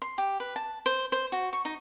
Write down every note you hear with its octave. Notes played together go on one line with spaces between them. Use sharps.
C6
G4
B4
A5
C5
C5
F#4
C#6
D#4